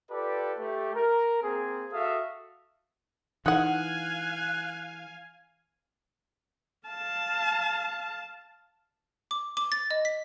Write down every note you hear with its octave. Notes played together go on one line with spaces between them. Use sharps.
F4 G4 A4 B4 D5
A3 G4
A#4
A#3 C4 G#4
F#4 A4 E5 F5 D#6
E3 D#4 F5 F#5 G#5 F#6
F5 A5
D6
D6
A6
D#5
B6